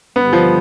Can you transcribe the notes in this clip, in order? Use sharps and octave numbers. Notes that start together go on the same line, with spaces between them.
G2 D3 G3 B3
F3